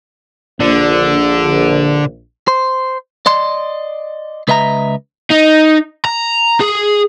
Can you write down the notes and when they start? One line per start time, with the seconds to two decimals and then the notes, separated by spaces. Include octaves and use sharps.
0.60 A#1 D3
2.48 C5
3.26 D5 D#5 C6
4.48 C#2 B4 D#5 E5 A#5
5.30 D#4
6.05 A#5
6.61 G#4